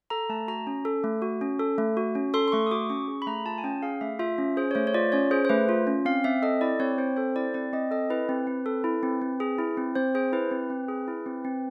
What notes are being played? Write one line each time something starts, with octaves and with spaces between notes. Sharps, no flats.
A4 A#5
A3 A5
F#4 A#5
C#4
A4
A3
F#4
C#4
A4
A3
F#4
C#4
A4 C6
C6
A3 C#6
D#6
F#4 D6
C#4 C#6
G#4
B5
A3 A#5
F4 A5
G#5
C#4 G5
G#4 F5
A3 E5
F4 E5
C#4
G#4 C5
C#5
A3 C5
C#5
F4 D5
C#4 C#5
G#4 C5
C5
A3 B4
F4
C#4
C4 F5
C4 E5
A4 D#5
E4 D5
C4 C#5
C4 C5
A4 C5
E4 D5
C4 D5
C4 D#5
A4 D#5
E4 B4
C4
C4
A4
E4
C4
C4
G#4
E4
C4
C4 C5
G#4 C5
E4 B4
C4
C4
G#4
E4
C4
C4